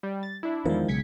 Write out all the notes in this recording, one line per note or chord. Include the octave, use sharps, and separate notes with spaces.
G3
A6
D4 E4
E2 D#3 F3 G#3 A#4
B1 C#3 G#3 G#6 B6 C#7